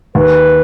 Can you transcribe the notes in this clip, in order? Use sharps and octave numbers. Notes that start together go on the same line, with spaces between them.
D#2 B4